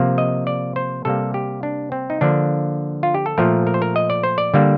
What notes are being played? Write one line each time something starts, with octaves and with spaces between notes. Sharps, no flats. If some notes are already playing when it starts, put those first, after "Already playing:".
Already playing: C3 F3 A#3
D#5
D5
C5
C3 G3 A#3 A4
G4
D4
C4
D#4
D3 F3 A#3 D4
F4
G4
A4
A#2 F3 A3 A#4
A#4
C5
A#4
D#5
D5
C5
D5
D3 G3 A#3